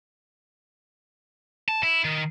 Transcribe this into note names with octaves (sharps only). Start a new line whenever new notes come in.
A5
E4
D#3